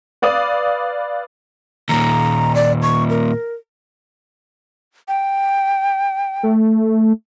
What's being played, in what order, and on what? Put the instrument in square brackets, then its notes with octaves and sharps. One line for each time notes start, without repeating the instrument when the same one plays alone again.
[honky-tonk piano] B4 D5 F5 D#6
[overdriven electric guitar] D#2 A#2 [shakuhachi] A#5
[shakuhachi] D5
C#6
A#4
[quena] G5
[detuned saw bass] A3